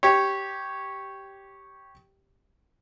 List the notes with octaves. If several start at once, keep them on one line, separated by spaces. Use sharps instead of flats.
G4 C#5